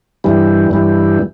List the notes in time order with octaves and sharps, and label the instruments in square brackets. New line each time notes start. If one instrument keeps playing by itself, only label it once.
[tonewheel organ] G2 E3 G3
G2 E3 G3